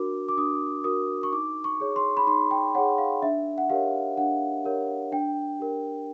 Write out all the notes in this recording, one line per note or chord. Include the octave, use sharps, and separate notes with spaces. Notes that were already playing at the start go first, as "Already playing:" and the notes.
Already playing: D4 F#4 A#4 D6
D6
D4 D#6
F#4 A#4 D#6
C#6
D#4 D6
C#6
G#4 C#5
C6
B5
D#4 C6
G5
G#4 C#5 F#5
F5
D4 E5
F#5
G4 A#4 C#5 F5
D4 F#5
G4 A#4 C#5
D4 G5
G4 A#4